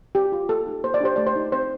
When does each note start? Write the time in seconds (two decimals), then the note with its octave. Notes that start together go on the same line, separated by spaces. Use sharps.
0.15 C4 G4
0.32 F4
0.49 A#3 A4
0.67 D#4 G4
0.84 A#3 C5
0.94 D5
1.00 D4 G4 C5
1.16 A3 D5
1.27 C5
1.36 D#4 G4
1.52 C4 C5